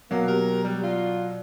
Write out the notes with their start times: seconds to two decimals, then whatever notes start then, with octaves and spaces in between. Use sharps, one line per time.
0.11 B2 F#3 A#3
0.28 G4 A#4
0.64 G3
0.83 F4 D5